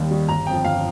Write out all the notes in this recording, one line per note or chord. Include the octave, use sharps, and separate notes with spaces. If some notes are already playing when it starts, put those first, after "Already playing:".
Already playing: D#2 D#3 G3
D#3 G3
G1 A#5
F2 F3 G5
G1 F5